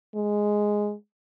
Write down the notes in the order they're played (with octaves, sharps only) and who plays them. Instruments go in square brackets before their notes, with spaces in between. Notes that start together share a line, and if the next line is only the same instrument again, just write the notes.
[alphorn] G#3